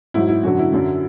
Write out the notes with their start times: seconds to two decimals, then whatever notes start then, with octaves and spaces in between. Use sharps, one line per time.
0.14 G#2 F#3 E4
0.29 E4
0.43 F#2 D3 F#3 F#4
0.59 E4
0.72 F#2 D3 F#3